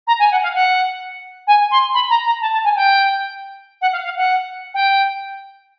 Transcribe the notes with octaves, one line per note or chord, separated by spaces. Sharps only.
A#5
G#5
F#5
F5
F#5
G#5
C6
B5
A#5
A#5
A5
A5
G#5
G5
F#5
F5
F5
F#5
G5